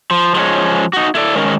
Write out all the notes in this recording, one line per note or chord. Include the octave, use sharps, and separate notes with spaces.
F3
F3 G#3 B3 C#4
D#4 F#4
E4 A4 D5
G#2 D#3 G#3 C#4 A#4